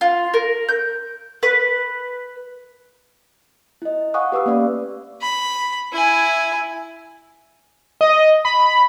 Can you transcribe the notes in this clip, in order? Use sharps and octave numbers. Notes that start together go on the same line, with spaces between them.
F4
A#4
G6
B4
E4 D#5
F5 F#5 G#5 C#6 D#6 F#6
G4 B4 D6 E6
A#3 C#4 D5 F5
B5
E4 G#5
D#5
B5